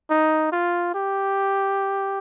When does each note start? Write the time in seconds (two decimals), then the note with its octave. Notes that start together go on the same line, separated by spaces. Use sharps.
0.10 D#4
0.52 F4
0.94 G4